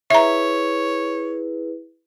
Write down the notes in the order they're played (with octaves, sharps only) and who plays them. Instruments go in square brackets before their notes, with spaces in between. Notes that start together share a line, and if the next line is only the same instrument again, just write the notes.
[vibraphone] E4 G#4 B4 [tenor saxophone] C#5 [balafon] E5 A#5